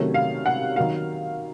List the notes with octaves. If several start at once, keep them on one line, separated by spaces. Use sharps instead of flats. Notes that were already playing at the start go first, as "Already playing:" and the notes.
Already playing: C3 D#3 F#3 A3 C#4
F5
F#5
D#3 F#3 A#3 F5